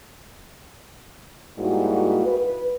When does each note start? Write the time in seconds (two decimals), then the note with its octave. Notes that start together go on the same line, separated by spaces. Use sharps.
1.58 G#2 G3 A#3 E4 F#4
2.25 B4